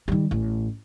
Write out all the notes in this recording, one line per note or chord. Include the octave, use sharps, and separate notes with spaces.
D#3 G3
A1